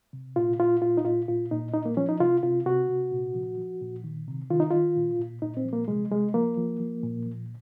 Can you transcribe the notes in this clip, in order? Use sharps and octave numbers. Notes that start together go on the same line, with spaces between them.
C3
A#2 F4
A#2 F4
A#2 F4
D#4
A#2 F4
A#2 F4
A#2 D#4
A#2 D#4
A#3
F3 C#4
D#4
C3 F4
C3 F4
C3 F#4
C3
A#2
F3
F3
A#2
D#3
C3
D#3 F4
D#4
D#3 F4
A#2
A#2
A#2 D#4
C4
F3
A#3
C3 G#3
C3 G#3
F3 A#3
F3
F3
A#2
F3